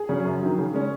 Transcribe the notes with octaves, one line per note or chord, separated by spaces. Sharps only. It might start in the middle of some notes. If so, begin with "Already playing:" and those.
Already playing: G#4
C#3 F#3 C#4
F#2
D#3 F#3
C#3
G#3 C#4